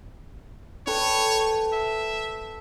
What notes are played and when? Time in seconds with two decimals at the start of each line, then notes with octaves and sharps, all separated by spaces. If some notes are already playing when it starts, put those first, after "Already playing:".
0.87 A4 B4 C#5 G5
1.73 E5